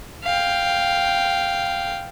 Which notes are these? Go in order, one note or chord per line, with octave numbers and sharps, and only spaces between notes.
F5 G5